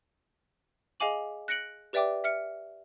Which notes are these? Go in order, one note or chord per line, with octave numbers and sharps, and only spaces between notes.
G#4 D#5 F5 G#5 D6 F#7
F#6 A#6 C#7 D7 F#7
G4 B4 D5 E5 G5 D6
E5 F6 C#7